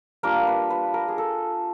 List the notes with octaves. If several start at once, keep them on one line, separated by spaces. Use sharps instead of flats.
G3 A#3 D4 F4 A#4
B4
B4
A#4
G#4
A4